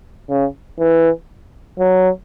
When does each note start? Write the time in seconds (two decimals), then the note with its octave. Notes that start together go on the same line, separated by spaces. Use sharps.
0.30 C#3
0.79 E3
1.79 F#3